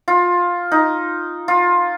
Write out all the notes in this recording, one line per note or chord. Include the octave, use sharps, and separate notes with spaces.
F4
D#4
F4